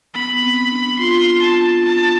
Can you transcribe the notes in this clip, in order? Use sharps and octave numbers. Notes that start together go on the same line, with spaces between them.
B3 B5
C4
D4
F4 C6
A5
A5